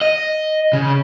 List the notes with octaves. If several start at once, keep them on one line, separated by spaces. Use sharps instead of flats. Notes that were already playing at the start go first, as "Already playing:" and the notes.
D#5
C#3